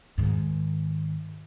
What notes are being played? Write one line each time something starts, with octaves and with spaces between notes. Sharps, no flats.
G#2 D#3